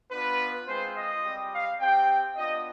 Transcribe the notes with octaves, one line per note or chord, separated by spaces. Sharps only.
B3 D4 F4 B4
G#3 C4 F4 C5
D#5
G3 C4 G4
F5
C4 G4 G5
B3 D4 F4 D#5